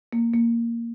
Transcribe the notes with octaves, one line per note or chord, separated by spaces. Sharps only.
A#3
A#3